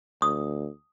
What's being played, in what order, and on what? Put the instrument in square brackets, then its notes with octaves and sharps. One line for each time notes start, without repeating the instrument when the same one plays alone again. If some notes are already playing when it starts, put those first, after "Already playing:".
[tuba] D2 [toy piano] D#6